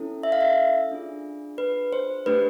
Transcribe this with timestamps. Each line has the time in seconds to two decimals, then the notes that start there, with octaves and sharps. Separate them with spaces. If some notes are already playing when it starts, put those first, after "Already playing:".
Already playing: C#4 E4 A4
0.23 E5
0.32 F5
0.41 E5
0.91 D4 F4 G#4
1.58 B4
1.93 C5
2.26 A3 D4 G4 B4